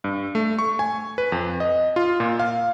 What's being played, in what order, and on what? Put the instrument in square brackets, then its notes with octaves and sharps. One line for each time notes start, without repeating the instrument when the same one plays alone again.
[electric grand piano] G2
A3
C#6
G#5
B4
F2
D#5
F4
A#2
F5